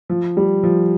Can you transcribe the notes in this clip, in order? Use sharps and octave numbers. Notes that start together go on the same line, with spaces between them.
F3
G3
F3